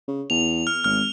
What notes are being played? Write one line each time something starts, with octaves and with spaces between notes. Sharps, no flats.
C#3
E2 F7
F6
G#1 F6